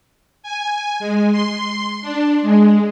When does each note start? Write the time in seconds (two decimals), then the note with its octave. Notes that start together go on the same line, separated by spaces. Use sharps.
0.43 G#5
1.00 G#3
1.32 C6
2.02 D4
2.42 G#3